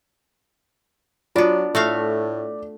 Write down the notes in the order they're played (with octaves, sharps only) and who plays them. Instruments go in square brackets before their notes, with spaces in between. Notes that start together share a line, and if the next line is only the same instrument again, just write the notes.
[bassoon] F#3 [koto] B3 D4 [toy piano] F4 [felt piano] D5
[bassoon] A2 [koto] A3 F#4 F5